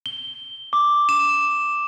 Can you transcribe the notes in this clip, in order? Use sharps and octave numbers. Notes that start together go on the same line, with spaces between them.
G7
D6
E7